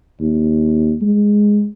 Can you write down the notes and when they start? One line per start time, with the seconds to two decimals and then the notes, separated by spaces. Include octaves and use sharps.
0.21 D#2
1.02 G#3